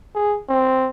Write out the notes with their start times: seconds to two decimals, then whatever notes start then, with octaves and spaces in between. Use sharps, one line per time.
0.15 G#4
0.49 C4